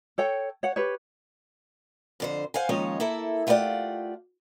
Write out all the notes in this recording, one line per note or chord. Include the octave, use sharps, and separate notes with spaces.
A4 C#5 G5
C#5 F#5
G4 B4 C#5
F2 D3 C5
C5 F5 F#5 G#5
D#2 F3 G#3 C#4 D#4 C#5
A#3 E4 A4
A3 F4 G4 A#4 D5 F#5